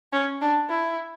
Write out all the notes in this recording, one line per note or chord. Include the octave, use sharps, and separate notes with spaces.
C#4
D4
E4